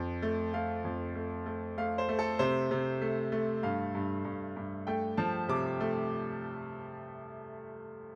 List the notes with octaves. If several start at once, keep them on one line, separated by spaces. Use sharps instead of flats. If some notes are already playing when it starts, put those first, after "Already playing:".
Already playing: F2
A3
A3 F5
F2
A3
A3
A3 F5
C5
A3
A4
C3 C5
C3
A3
A3
G2 F5
G2
G2
G2
A3 G5
F3 A5
C3 D6
A3